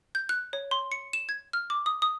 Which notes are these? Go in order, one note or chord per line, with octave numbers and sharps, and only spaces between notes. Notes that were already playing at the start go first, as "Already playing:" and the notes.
G6
F#6
C#5
C6
C#7
E7
G#6
F6
D6
D#6
D#6